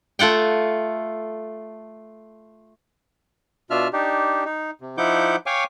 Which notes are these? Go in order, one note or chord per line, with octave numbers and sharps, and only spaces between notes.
A3 F4 F#5 G5
B2 D4 F4 E5 F6
D4 D#4 G4
D#4
C3
F3 D#4 E4 F#5 D6 G6
C#5 F5 G5 G#5 C#6 D6